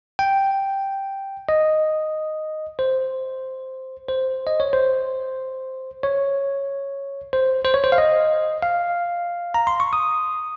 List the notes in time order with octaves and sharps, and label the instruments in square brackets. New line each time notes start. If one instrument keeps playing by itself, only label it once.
[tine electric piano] G5
D#5
C5
C5
D#5
C#5
C5
C#5
C5
C5
C#5
C5
F5
D#5
F5
A#5
C6
C#6
D#6